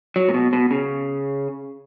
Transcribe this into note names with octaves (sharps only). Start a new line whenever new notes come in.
F#3
A#2
B2
B2
C#3